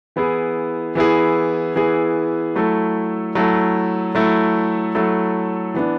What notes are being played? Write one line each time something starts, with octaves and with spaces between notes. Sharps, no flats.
E3 B3 E4 G#4
E3 B3 E4 G#4
E3 B3 E4 G#4
F#3 A3 E4 A4
F#3 A3 E4 A4
F#3 A3 E4 A4
F#3 A3 E4 A4
E3 B3 D4